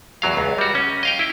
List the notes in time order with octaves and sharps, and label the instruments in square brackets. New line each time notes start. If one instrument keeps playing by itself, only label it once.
[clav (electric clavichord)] E2 F#3 F5
C#2
G3 F#4
C#4
D#5 F5 G5
E4